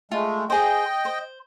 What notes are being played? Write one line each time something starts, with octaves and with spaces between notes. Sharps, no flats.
G#3 A3 F4
G#4 C5 D#5 G5
C5